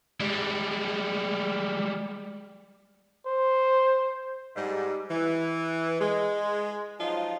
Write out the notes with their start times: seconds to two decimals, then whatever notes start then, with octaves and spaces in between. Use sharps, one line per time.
0.21 G3 G#3
3.26 C5
4.55 G#2 G3
5.09 E3
6.00 G#3
6.99 F3 F#3 D#4 F4